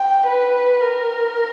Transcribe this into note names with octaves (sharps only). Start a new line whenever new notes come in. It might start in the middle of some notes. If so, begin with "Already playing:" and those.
Already playing: G5
B4
A#4